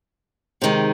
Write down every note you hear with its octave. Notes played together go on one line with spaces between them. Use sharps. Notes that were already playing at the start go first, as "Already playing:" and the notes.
C3 D#3 G#3